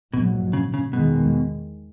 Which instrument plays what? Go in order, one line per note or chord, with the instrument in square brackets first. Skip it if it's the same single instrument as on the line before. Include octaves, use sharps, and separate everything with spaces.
[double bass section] A#1 G#2 F#3 [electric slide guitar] B2
[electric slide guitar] C#3
C#3
[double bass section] E2 D#3 G#3 [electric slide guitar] B2